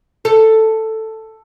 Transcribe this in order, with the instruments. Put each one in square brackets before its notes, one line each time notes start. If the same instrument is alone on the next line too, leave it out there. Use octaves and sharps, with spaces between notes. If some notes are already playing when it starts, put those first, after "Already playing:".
[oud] A4